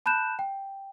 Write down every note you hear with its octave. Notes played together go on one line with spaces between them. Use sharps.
A5 B5 F#6 G6 E7
G5